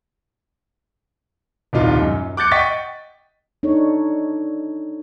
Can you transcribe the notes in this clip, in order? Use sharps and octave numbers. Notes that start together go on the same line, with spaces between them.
D#1 C2 D#4 F4
F#2
D6 F#6 G6 A6 C#7 D7
D#5 F#5 G5 C#6 A6 B6
D4 D#4 A4 C#5